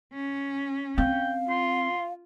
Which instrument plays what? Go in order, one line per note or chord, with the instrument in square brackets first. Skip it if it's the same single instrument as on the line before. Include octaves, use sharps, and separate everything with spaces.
[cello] C#4
[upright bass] C4 [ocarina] F5 [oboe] G5
[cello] F4 [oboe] C6